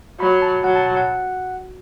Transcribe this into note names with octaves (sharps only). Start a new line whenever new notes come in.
F#3 B5
A5
F#3 F#5
A5
A5
F#5